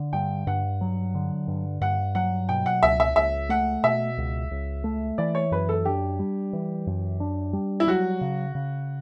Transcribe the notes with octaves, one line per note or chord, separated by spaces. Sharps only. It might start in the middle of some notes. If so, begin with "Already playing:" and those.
Already playing: D3
G2 G5
G2 F#5
F#3
D3
G2
G2 F#5
F#3 F#5
B2 G5
F#5
C#2 E5
E5
C#2 E5
A3 F#5
B2 E5
C#2
C#2
A3
E3 D5
C#5
F#2 B4
A4
D4 G4
G3
E3
F#2
D4
G3
E4
F#3 F#4
C#3
C#3